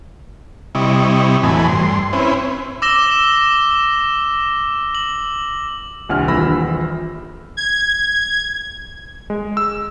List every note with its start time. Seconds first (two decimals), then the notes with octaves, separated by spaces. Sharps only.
0.75 C3 G3 E4 D#5 C#6
1.43 E2 A2 E3 F#3 G#5 B5
1.68 G2 C6
2.13 C4 C#4 E4 B4
2.82 D6 E6 A#6 E7 G7
4.95 F#7
6.09 D#1 C2 G2 F#5 G#5 F6
6.28 D#1 A#1 E3 B5 E6 A#6
7.57 G#6
9.30 G#3
9.57 E6